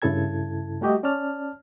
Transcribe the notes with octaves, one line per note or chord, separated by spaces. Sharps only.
G2 C#3 E4 A4 A5 G#6
G3 A3 F#4 G4 D#5
C#4 D5 A5 F6